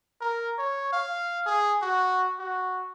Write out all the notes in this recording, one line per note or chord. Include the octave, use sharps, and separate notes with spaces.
A#4
C#5
F5
G#4
F#4
F#4